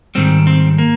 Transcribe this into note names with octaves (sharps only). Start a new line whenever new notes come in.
G#2 D#3 G3 C4
C4
A#3